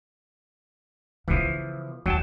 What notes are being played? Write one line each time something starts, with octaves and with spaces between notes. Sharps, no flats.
C#3 E3 F3 B3
D#2 F#3 G5 A5